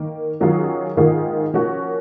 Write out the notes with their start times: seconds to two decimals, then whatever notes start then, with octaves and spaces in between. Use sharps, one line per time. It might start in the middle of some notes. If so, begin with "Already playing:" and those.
Already playing: D#3 A#3 D#4
0.40 D#3 F#3 C#4 F4 G#4
0.96 G#2 D#3 A#3 F4 G#4
1.54 F3 A#3 C#4 F#4